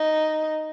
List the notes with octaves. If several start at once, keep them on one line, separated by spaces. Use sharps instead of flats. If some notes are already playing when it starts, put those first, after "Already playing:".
Already playing: D#4